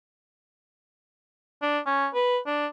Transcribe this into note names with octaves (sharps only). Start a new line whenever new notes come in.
D4
C#4
B4
D4